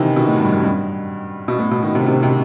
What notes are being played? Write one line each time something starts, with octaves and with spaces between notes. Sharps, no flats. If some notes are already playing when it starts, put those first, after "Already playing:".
Already playing: C3 D#3 E3
B2
A2
G2
F#2
G2
B2
A2
B2
D#3
C3
C3
C3